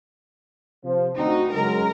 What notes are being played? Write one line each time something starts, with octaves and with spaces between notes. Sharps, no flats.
C3 F3 C5
D2 C4 D#4 F#4
C#3 F#3 G#3 A#4